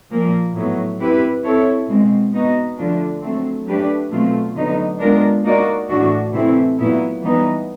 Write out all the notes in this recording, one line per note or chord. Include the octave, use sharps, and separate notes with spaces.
A#2 F3 A#3
A2 F#3 B3
C4 E4 G4 B4
C4 E4 A4 C#5
B2 G#3 C4
B3 D#4 F#4
D3 F3 A3 D4 F4
F#3 A3 C4
F#3 A3 D4 G4 B4
B2 F#3 A3 C4 F4
D3 F#3 B3 D#4
G#3 B3 D4 F4 A#4
A#3 D#4 F#4 A#4 D5
A2 E3 A3 D4 F#4
C3 E3 A3 C4 E4
A#2 F#3 B3 E4
E3 G3 B3 D#4